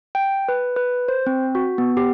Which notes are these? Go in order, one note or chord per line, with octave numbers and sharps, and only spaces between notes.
G5
B4
B4
C5
C4
F#4
B3
G4